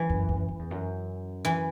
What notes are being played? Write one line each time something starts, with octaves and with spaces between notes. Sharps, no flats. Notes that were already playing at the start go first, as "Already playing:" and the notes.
Already playing: E3
F#2
F#2
F#2
E2
F#2
E3